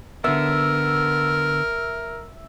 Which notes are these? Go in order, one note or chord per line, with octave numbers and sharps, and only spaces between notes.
D3 B3 A#4 E5